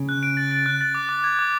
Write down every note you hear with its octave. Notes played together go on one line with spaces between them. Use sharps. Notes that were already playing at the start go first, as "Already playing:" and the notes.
Already playing: C#3
F#6
D7
A6
A6
F#6
A6
D6
D6
G#6
D6